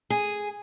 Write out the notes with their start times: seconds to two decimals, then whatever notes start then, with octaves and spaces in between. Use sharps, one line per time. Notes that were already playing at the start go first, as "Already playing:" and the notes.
0.10 G#4